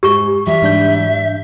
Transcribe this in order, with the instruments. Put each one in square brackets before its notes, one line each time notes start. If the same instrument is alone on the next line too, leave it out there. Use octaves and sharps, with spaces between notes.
[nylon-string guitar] G#2 [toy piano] G4 C#6
[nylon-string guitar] E3 F#3 G3 [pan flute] E5
[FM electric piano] G#2 D4 G6